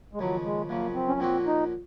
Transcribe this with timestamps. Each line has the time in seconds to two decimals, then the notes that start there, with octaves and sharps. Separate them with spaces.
0.13 G#3
0.19 D#2 C#3 F3 F#3
0.44 G#3
0.69 F#2 C#3 F3 A#3
0.95 C4
1.08 C#4
1.20 A#2 F3 A#3 C4 C#4 F#4
1.46 D#4